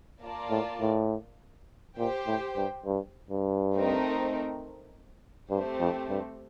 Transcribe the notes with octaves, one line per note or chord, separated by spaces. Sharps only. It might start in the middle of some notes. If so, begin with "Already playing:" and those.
A#3 F4 A#4 D5 A5
A2
A2
A#2 G4 C5 G5
A2
G2
G2
G2
A3 C4 D#4 A#4
G2 A3 C4 G4 C5
F2
G2